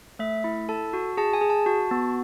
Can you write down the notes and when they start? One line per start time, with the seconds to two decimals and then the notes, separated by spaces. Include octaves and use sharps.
0.19 A3 E5
0.44 E4
0.69 A4 A5
0.93 F#4
1.17 G#4 A5
1.33 G#5
1.41 G#4
1.50 A5
1.66 F#4 A5
1.91 B3